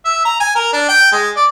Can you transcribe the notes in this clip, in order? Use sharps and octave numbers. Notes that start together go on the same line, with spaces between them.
E5
A#5
G#5
A#4
D4
G5
G#3
D5